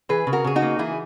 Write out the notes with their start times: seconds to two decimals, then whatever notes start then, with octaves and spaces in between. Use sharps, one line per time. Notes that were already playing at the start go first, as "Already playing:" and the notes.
0.09 E3 G#4 B4
0.27 C#3
0.33 F#4 A#4
0.44 C#3 G#4
0.56 D#4 F#4
0.62 A#3
0.79 E3 E4 G#4